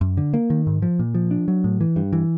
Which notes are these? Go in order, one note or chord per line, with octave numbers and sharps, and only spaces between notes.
F#2
D3
A#3
D#3
G#2
F3
A#2
F3
D4
F#3
A2
E3
G2
E3